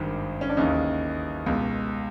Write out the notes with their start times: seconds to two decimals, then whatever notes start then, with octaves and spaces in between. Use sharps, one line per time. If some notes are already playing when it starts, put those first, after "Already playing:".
Already playing: G#1 G2 D#3
0.41 C#4
0.49 D4
0.57 D#2 C#3 E3 D#4
1.46 C#2 B2